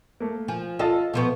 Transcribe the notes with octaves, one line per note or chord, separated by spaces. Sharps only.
A3 A#3
F3 G#5
F4 A4 D#5 A5
B2 F3 B3 A4 C#6